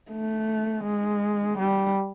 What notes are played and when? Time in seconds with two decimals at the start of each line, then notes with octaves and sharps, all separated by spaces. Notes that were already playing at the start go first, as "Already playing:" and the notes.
0.11 A3
0.84 G#3
1.58 G3